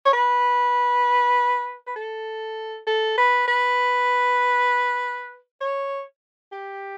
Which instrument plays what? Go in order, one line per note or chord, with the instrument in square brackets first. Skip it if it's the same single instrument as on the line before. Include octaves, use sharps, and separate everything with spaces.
[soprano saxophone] C#5
B4
B4
A4
A4
B4
B4
C#5
G4